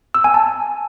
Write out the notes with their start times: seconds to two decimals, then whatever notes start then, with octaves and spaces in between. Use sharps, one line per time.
0.15 E6
0.24 G#5
0.34 A5